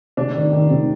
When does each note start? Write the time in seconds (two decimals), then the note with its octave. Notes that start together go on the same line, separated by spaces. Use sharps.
0.17 C3 D4
0.35 D#3
0.52 D#3
0.70 C3